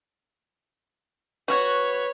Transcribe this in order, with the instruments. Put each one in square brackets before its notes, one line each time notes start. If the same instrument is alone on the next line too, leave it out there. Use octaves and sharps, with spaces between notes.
[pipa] F#4 [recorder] B4 [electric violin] C#5